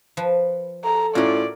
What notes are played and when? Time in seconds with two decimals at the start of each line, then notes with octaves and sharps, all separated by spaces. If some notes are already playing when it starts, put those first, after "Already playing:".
0.17 F3 B4
0.85 A4 A#5
1.15 A2 C#4 F4 F#4 A#4 D5